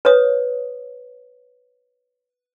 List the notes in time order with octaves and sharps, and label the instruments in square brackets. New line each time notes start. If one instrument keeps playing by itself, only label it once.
[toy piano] B4 C#5 D#6